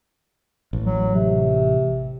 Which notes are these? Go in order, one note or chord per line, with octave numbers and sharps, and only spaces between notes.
A1
F#3
C3